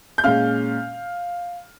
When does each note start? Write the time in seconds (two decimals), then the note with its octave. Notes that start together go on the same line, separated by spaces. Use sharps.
0.18 G6
0.24 A#2 G#3 C#4 F5 F6